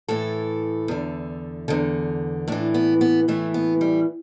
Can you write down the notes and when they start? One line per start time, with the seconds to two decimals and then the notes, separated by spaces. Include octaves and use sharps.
0.08 A2 E3 A4
0.88 E2 D3
1.68 E2 D3
2.48 A2 E3 D4
2.74 B3
3.01 B3
3.28 A2 E3 A3
3.54 B3
3.81 G3